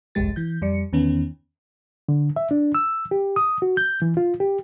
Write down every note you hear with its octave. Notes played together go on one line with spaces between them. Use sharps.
G1 C2 F2 G#3 G4 A6
E3 G6
F2 G3 D5 C#7
E2 D#3 B3 C#4
D3
E5
D4
E6
G4
D#6
F#4
G6
E3
F4
G4